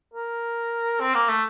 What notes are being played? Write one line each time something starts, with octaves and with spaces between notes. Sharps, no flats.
A#4
C4
A#3
A3